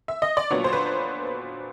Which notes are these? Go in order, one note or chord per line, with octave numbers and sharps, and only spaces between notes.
E5
D#5
D5
A#2 F#3 B3 D4 C#5
C5
B4